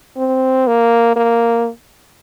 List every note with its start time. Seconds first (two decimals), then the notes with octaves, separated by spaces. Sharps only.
0.17 C4
0.67 A#3
1.16 A#3